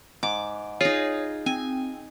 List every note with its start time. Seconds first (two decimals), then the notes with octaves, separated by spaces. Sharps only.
0.23 G#2 D6
0.81 D#4 F4 G#4 C#5
1.46 C4 G#5